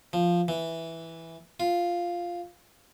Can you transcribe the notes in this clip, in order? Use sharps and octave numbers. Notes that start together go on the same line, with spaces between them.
F3
E3
F4